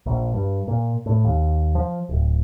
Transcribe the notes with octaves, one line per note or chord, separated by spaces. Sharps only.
A#1
G2
A#2
A2
D#2
F3
D1